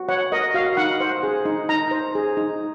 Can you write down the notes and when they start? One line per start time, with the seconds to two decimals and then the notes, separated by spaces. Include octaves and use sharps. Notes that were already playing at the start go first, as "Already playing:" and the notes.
Already playing: F#4
0.09 C#5 F#5
0.32 A#4 D#5
0.54 F#4 F5
0.77 D#4 F#5
1.00 C5
1.23 G#4
1.45 D#4
1.69 D#4 A#5
1.91 C5
2.15 G#4
2.37 D#4